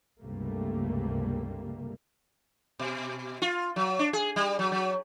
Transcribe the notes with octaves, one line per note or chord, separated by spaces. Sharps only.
C#2 G2 C3 G3 A3 A#3
B2
F4
F#3
D4
G#4
G3
F#3
F#3